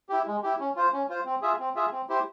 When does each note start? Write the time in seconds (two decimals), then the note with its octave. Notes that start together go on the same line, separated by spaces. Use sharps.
0.09 E4 G4
0.27 G#3
0.43 E4 G4
0.60 C#4
0.76 F4 C5
0.93 C#4
1.09 F4 C5
1.26 C4
1.42 F4 G#4 E5
1.59 C4
1.76 F4 G#4 E5
1.92 C4
2.09 E4 G4 C5